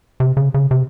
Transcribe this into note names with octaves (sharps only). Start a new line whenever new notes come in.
C3
C#3
C#3
C3